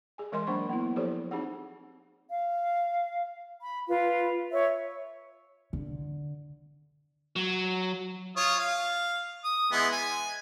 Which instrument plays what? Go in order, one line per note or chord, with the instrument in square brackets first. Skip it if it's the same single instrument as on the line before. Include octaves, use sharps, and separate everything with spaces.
[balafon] G#4 G#5
E3 G#3 A#4 D#5 G#5 C6
F#3 A#3 D4 C5 B5 C#6
A#3 B3 E4
F3 G4 A4 C5 C#5
C4 D#4 F#4 G#4 F#5
[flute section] F5
B5
F4 B4
C#5 E5
[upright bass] D3
[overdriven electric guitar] F#3
[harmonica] F4 C#5 D#6
F5
D#6
E3 G#3 B3
G#5